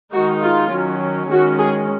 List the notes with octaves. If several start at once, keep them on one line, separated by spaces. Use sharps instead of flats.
D#3 G#3 D#4 F#4
F4
D#3 F#3 C#4
D#3 G#3 C#4 F#4
G#4